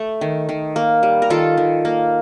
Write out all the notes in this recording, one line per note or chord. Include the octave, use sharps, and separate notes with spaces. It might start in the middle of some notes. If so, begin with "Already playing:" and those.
Already playing: A3
D#3
D#3
A#3
G3
A#4
D#3 F4 A4
D#3
A#3